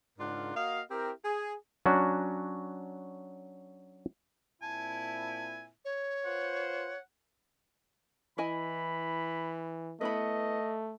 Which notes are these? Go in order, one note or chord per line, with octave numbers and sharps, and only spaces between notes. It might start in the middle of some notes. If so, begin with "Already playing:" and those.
G#2 C#3 D4 F4 A#4 F#5
A#3 F#4 D#5 F5
C4 E4 G4 A#4
G#4
F#3 C#4 D4 F#4
A#2 C4 E4 G#5 A5
C#5
F4 B4 C5 F#5
E3 E4 D#5 G#5 B5
A3 B3 E4 D#5 B5